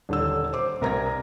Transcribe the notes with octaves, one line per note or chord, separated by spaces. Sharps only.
D#1 D3 E6
C5 D6
C2 A#4 A#5 G#6 A#6